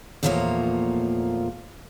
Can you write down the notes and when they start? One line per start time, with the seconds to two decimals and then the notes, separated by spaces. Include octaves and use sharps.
0.23 E2 A#2 F3 A3 A#3 C#5